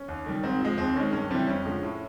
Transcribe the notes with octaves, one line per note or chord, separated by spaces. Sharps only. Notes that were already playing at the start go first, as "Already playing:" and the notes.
Already playing: C#4
D#2
D#3 G3
G#2 C4
F3 G#3
D#2 C4
D#3 G#3 C#4
G2 C#4
E3 G3 C4
F2 C#4
D3 F3 G#3
A2